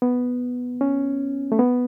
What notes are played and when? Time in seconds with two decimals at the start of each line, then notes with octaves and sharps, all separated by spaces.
0.02 B3
0.81 C#4
1.52 A3
1.59 B3